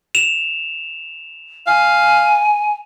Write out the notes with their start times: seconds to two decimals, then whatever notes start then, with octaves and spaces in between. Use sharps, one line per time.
0.15 E7 F7
1.67 F5 G#5